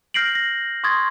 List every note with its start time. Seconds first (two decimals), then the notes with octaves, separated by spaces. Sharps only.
0.14 F6 G6 A#6 C7 D7 F#7
0.35 A#6
0.84 C6 C#6 D#6 G#6 A6